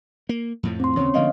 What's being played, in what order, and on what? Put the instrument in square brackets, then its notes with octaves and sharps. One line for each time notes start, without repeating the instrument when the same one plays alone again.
[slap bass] A#3
F2 A2 F3
[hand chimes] C4 C6
[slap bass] D#2 C#3 [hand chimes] C#4 C#5
[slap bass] D3 F3 A#3 [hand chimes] B3 D#5 F5